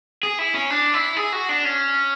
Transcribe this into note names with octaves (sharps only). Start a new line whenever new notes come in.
G#4
E4
C#4
D4
E4
G#4
F#4
D4
C#4